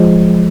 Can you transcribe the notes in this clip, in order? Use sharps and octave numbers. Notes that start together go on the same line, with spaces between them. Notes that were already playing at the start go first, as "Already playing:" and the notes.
Already playing: F3 G#3